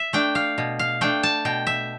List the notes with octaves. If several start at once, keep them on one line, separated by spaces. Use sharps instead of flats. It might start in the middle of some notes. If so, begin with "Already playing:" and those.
Already playing: E5
A3 D4 G5
F5
B2
F5
A3 D4 G5
A5
B2 G5
E5